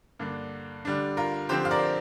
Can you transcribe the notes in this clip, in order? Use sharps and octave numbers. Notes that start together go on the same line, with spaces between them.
G2 D3 A#3 D4
D3 G3 D4
F4 A#4
D3 F3 C4 G4 C5
F5
A#4 D5